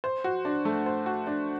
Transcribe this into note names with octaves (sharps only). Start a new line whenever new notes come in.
C5
F#4
D4
A3
C5
F#4
D4